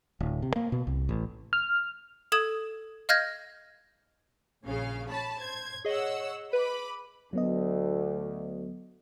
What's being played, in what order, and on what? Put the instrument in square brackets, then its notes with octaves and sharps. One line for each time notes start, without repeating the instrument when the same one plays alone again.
[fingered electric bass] D1
C3
A#3
B2
C2
A1
[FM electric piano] F6
[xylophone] A4 D#6 G#6 E7
D#5 F5 F6 G6 G#6 A#6
[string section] A#1 C#3 F5
C#5 A5 B5
C5 G#6
[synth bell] G#4 D#5 [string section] C#5 F#5 E6
[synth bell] B4 [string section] B5 D6
[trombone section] D2 [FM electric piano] F#3 B3 D#5